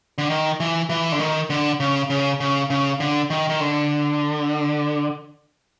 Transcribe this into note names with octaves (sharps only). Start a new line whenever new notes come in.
D3
D#3
E3
E3
D3
D#3
D3
C#3
C#3
C#3
C#3
D3
D#3
D#3
D3